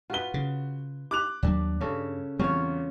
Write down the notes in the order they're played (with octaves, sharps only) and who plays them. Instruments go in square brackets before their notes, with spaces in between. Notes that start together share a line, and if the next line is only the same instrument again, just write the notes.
[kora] F4 B4 [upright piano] F#4 G7
[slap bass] C#3
[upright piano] D6 F#6 F7
[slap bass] D#2 F#3 G3 [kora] D4
[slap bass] G2 [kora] C#3 C#4 A4
[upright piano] E2 [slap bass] G3 C4 [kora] C#4 F4 C#5